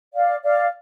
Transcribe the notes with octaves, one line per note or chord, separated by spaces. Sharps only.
D5 F5
D5 F5